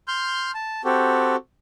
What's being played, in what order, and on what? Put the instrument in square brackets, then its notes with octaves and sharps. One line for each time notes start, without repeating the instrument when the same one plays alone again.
[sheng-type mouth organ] C6 F6 G6
A5
C4 F#4 G4 A4